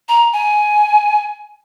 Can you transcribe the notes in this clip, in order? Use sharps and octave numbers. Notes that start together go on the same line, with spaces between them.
A#5
G#5